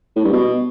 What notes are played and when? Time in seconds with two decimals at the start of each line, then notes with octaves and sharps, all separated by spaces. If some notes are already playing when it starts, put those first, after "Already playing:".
0.16 A2
0.24 G2
0.33 B2